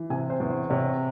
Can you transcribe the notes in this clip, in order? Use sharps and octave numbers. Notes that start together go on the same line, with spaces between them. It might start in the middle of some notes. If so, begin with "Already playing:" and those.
Already playing: E3
C3 G#5
C5
E2
C5
C3 C#5